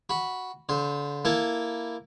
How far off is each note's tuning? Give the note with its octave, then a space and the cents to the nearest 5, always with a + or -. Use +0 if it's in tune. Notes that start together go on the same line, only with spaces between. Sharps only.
F#4 +0 B5 -5
D3 -35 C5 +0
A#3 +0 E4 +0 A4 +0